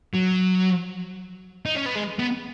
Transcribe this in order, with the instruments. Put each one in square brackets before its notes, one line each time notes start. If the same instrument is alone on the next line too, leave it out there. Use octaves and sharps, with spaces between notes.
[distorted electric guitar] F#3
D#4
C#4
B3
G#3
B3